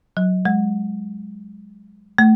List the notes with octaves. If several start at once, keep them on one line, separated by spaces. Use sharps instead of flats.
F#3
G#3
A3